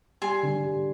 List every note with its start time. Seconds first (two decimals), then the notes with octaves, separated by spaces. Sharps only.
0.22 G3 G#5 C6
0.43 D3
0.65 G3